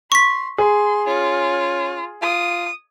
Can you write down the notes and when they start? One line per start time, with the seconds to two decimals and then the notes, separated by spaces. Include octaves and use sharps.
0.12 C6 C#6 B6
0.58 G#4 C6
1.07 C#4 F4
2.22 F4 D#6